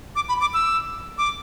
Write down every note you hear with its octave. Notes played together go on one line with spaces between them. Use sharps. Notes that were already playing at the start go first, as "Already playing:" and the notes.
D6
B5
D6
E6
D6